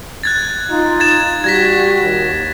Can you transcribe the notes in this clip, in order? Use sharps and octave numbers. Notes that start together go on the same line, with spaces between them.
F#6 G#6 A6
D#4 F4
G#6 A6 E7
G3 F#4 G#6 A#6 B6
D#2